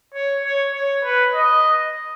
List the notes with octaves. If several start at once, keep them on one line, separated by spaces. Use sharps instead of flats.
C#5
C#5
C#5
B4
D#5